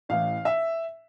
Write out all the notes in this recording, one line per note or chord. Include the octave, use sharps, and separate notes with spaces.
A1 A2 E3 F5
E5